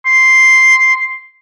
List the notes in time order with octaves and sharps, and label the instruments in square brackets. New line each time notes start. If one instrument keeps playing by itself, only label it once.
[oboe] C6